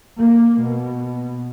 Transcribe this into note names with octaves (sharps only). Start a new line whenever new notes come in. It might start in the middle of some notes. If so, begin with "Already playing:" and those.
A#3
B2